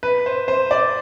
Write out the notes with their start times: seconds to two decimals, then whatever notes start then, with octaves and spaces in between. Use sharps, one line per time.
0.03 B4
0.26 C5
0.48 C5
0.71 D5